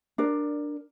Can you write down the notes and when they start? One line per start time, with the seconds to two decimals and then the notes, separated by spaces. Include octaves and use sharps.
0.18 D4 A#4 D5